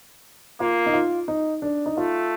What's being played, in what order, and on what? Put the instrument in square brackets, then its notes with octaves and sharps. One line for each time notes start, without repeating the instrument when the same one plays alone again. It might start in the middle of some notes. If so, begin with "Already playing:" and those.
[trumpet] A#3 [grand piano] F4
[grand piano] D#4
F4
D#4
D4
D#4
[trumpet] A3 [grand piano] F4